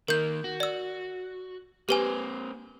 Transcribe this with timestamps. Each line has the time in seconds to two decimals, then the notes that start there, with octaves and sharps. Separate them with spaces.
0.08 D#3 A#3 A#4 G6
0.44 F#4
0.60 D5 E6
1.89 A#3 C4 G4 B4 G#5